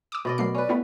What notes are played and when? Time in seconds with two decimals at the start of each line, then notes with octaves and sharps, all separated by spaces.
0.12 D6 D#6
0.25 B2 D5 D#5
0.38 F#3 A3 A#4 C7
0.55 C#4 B4 D5
0.69 A3 B3 E4